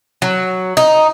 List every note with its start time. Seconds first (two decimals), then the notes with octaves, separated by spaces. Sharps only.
0.22 F#3
0.77 D#4